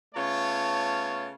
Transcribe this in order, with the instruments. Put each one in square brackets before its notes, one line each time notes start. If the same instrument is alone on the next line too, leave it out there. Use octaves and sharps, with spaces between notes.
[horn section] C#3 A3 B3 F4 C#5 A5